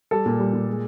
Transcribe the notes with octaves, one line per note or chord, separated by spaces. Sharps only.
G3 A4
A#2
G3
A#2
G#3